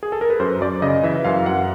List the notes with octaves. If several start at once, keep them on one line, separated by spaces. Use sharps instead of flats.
G#4
A4
A#4
B4
F#2 C5
F#2 D5
C#3 D#5
E3 E5
F#2 F5
F#2 F#5